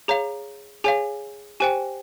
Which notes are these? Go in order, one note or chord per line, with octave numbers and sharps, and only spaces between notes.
G#4 C#5 F5 A#5
G#4 C#5 F5 G#5
G4 C5 G5 G#5